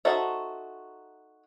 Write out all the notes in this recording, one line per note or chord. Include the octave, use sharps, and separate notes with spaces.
D#4 F#4 A4 C5 E5